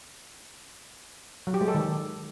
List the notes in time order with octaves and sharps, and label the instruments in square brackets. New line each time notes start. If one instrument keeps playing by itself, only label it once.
[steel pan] F#3
G4
G#3
A4
D#3